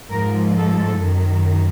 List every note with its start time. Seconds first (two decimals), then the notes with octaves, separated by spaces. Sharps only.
0.11 G#2 F3 A#4
0.56 A4
1.02 F#2 D#3